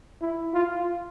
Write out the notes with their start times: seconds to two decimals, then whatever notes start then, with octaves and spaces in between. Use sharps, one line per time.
0.21 E4
0.53 F4